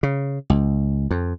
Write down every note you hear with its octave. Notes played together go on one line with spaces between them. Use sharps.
C#3
C#2
F2